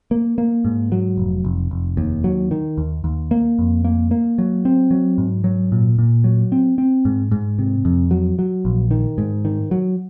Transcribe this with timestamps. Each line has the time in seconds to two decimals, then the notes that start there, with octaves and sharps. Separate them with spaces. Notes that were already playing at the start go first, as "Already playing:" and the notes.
0.11 A#3
0.38 A#3
0.65 G#2
0.92 F#3
1.18 F1
1.45 F1
1.71 F1
1.97 D#2
2.24 F#3
2.51 D#3
2.78 D#2
3.04 D#2
3.31 A#3
3.58 F2
3.84 A#3
4.11 A#3
4.38 F#3
4.65 C4
4.91 F#3
5.18 G#2
5.44 F#3
5.72 A#2
5.99 A#2
6.24 F#3
6.52 C4
6.78 C4
7.05 G#2
7.31 G#2
7.59 C3
7.85 F2
8.11 F#3
8.39 F#3
8.65 A#1
8.91 D#3
9.18 G#2
9.45 D#3
9.71 F#3